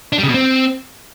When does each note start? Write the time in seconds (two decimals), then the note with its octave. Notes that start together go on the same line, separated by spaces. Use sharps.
0.13 D4
0.18 G3
0.23 C#3
0.29 B2
0.34 C4